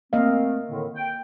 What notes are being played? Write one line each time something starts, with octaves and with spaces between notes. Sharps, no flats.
A3 A#3 C4 D#5 F5
A2 D3 D#3
G5